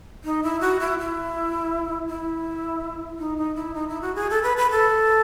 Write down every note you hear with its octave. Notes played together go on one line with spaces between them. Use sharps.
D#4
E4
F#4
E4
E4
E4
D#4
D#4
E4
D#4
E4
F#4
G#4
A4
B4
B4
A4